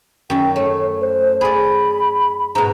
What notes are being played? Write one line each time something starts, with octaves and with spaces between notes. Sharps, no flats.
F#2 D#3 G5
A3 C#5
C5
G#4 D5 B5
G#2 B2 A#5